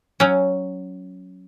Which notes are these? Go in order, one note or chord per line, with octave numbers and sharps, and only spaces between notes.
F#3 C#4